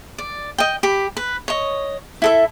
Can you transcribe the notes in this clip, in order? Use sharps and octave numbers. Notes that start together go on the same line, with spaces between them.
D5
D#5 G5
G4 B5
B4
C#5 D#5
E4 A4 E5